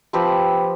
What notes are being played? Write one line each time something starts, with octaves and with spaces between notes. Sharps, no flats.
F3 C4 G4 B4